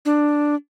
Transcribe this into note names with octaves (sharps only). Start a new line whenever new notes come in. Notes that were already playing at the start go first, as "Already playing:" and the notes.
D4